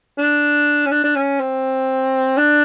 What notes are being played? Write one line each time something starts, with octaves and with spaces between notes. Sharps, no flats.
D4
C#4
D4
D4
C#4
C4
D4